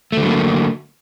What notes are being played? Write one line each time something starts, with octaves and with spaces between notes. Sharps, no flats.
D3 F#3 A3 A#3